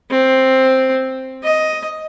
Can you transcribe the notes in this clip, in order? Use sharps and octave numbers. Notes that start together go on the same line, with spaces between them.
C4
D#5